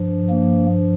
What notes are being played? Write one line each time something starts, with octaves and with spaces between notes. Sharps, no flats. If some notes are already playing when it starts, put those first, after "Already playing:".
Already playing: G2 F3
A#3